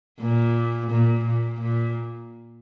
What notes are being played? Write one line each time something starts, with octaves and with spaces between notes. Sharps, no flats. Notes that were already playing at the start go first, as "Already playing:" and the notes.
A#2
A#2
A#2
A#2